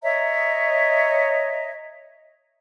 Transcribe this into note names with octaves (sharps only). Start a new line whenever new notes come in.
C#5 D#5 E5 A#5